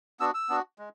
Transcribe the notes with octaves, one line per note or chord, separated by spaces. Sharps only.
B3 D4 F#4 E6
E6
B3 D4 F#4
G#3